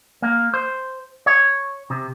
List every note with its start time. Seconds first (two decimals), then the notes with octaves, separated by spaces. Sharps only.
0.22 A#3
0.54 C5
1.26 C#5
1.90 C3